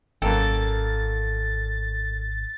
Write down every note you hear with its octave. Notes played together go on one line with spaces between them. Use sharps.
G#1 F#2 A#3 A4 G5 A6